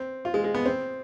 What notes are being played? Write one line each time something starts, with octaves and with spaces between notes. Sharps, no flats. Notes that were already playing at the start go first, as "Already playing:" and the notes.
Already playing: C4
F4
G#3
G#3
B3
C4